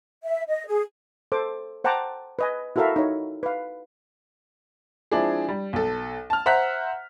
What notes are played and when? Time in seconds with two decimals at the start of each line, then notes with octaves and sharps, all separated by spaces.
0.24 E5
0.47 D#5
0.67 G#4
1.32 A4 C5 D6
1.84 C5 F#5 G5 A5 A#5 D6
2.39 B4 D#5 G#5
2.76 E4 F#4 A4 A#4 E5 F5
2.96 D#4 C#5
3.43 B4 F5
5.11 F3 G#3 C4 D4 E4 G#4
5.48 G3
5.73 B1 A4
6.30 A5 F6
6.46 C5 E5 F#5 A#5 F#6 B6